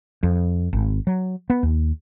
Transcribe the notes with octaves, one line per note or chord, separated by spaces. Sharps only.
F2
G#1
F#3
B3
D#2